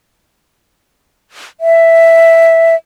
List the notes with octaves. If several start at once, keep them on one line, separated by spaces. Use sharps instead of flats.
E5